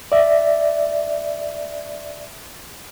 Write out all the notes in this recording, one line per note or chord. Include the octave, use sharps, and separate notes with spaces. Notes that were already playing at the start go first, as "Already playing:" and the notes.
D5 E5